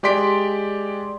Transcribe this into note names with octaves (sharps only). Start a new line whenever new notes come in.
G#3 G4 D5 C6 B6 D7